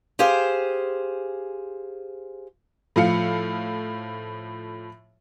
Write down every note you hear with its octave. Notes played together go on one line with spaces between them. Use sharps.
G4 G#4 C5 F5
A2 F3 F5 C#7